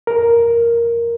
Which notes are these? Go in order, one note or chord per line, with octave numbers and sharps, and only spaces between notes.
A#4